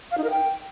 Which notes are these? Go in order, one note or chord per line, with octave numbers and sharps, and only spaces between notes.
F5
D#4
A#4
G5